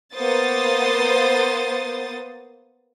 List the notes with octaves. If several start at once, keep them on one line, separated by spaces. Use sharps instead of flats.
A#3 B3 C5 D#6 A6